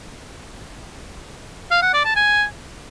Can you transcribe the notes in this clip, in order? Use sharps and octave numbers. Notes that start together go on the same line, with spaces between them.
F5
F#5
D5
A5
G#5